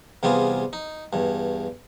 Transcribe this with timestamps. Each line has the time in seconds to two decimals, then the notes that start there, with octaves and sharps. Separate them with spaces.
0.23 E2 C3 G3 B3 F4 G#4
0.73 D#4
1.13 E2 G2